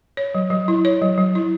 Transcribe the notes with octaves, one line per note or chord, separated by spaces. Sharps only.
C#5
F#3
F#3
E4
C#5
F#3
F#3
E4